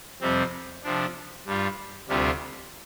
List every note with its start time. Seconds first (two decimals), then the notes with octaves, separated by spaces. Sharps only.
0.21 F2 C3 G3 C4
0.83 C3 F3 D4
1.46 G2 G3 F4
2.09 D2 C3 G3 D4 F4